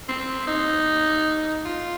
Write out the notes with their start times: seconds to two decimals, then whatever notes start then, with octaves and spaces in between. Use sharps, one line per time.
0.08 C4
0.47 D#4
1.66 F4